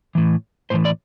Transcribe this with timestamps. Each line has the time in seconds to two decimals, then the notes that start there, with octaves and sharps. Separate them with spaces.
0.15 A2 E3
0.70 A2 E3 C5
0.85 D5